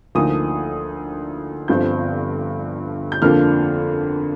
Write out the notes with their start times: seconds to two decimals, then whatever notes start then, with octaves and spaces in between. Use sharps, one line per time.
0.15 D2 D3 F3 A#3 D#4 D#6
1.68 G1 G2 D3 F3 C4 G6
3.12 G6
3.22 F2 D3 F3 A#3 D4 F6